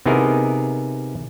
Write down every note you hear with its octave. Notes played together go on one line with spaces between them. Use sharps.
C3 B3 D#4 E4 G#4 A#4